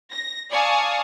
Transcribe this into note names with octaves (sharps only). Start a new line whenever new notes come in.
A#6
D5 F5 G#5 A5 C#6 D#6